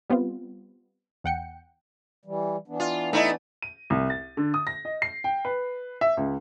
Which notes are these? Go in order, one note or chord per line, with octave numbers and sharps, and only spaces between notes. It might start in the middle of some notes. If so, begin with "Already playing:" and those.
G3 B3 C4 F4
E2 F#5 G5 C#7
E3 G3
E3 B3 D4
F4
A3 D#4 E4
D#7
C2
A6
D3
D#6
A#6
D#5
C7
G5
B4
E5
C#2